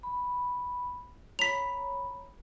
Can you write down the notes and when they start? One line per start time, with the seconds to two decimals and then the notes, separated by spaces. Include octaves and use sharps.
0.03 B5
1.39 C#5 A#5 B5 B6 F7